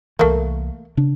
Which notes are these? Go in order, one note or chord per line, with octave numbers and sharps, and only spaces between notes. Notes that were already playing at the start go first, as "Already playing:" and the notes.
C2 E3 A3 A#3
C#3 D4